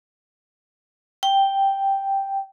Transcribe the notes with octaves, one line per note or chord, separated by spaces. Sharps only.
G5